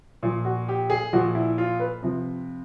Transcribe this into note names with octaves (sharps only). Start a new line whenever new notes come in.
A#2 F3
F#4
G4
G#4
A#2 F3 F#4
E4
F4
B4
C3 F3